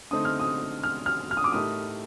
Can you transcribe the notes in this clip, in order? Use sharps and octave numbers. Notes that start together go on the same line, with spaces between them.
D3 A3 C4 D#4 D#6
F6
D#6
F6
F6
F6
D#6
D6
A2 A3 D#4 G4 A#4 D#6